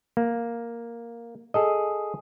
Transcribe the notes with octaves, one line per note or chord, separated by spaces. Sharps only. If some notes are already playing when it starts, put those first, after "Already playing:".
A#3
G#4 A4 D#5